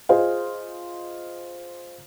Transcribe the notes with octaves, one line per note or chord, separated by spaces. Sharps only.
F4 G#4 C5 D#5 F5